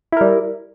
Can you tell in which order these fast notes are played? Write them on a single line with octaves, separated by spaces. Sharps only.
E4 A#4 G3